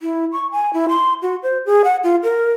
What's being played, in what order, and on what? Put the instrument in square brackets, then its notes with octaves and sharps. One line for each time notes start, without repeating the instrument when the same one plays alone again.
[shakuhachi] E4
C#6
G#5
E4
C6
F#4
C5
G#4
F#5
F4
A#4